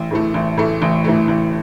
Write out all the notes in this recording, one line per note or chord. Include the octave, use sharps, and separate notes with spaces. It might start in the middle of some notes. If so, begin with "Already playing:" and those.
Already playing: A1
A2 E3 A3
A1
A2 E3 A3
A1
A2 E3 A3
A1